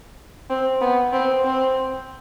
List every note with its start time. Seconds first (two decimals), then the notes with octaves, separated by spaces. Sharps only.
0.50 C4
0.81 B3
1.13 C4
1.44 C4